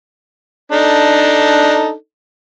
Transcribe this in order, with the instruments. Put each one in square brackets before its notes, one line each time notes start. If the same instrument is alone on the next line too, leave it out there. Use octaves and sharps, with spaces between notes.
[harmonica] D4 D#4 A4